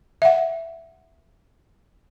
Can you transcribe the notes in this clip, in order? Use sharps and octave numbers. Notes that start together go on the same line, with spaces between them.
E5 F#5